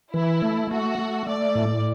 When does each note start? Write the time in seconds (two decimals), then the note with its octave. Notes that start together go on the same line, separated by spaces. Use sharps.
0.14 E3 E4
0.42 A3
0.71 A3 F#4
0.99 A3
1.27 A3 D5
1.55 A2